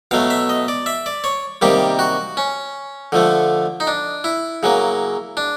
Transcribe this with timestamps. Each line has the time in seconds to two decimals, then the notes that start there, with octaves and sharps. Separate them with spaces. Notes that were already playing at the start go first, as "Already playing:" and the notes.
0.11 B2 F#3 A3 F5
0.30 E5
0.49 D#5
0.68 D5
0.86 E5
1.06 D5
1.24 C#5
1.62 C3 D#3 G3 A#3 G4
1.99 F#4
2.37 C#4
3.12 D3 F3 A3
3.80 D#4
3.87 D4
4.24 E4
4.63 C#3 F#3 A#3
5.37 D4